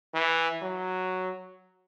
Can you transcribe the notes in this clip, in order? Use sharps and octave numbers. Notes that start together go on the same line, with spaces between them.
E3
F#3